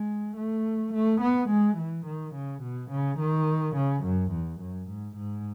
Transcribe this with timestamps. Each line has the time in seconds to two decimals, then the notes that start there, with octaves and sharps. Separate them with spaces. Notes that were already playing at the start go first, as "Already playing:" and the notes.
Already playing: G#3
0.36 A3
0.94 A3
1.21 B3
1.49 G#3
1.77 E3
2.06 D#3
2.35 C#3
2.62 B2
2.91 C#3
3.19 D#3
3.76 C#3
4.04 F#2
4.31 E2
4.60 F#2
4.89 G#2
5.17 G#2